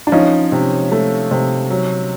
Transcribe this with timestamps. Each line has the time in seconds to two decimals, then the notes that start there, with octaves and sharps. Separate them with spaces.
0.07 D4
0.12 F3 C#4 D#4
0.52 C3
0.92 A3
1.31 C3
1.70 F#3